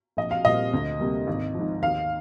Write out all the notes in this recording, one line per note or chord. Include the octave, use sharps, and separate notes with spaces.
A#1 D#5
F5
A#2 G3 C4 D#5
D2
C3 G3 A#3
G#1
G#2 F3
D#2 F5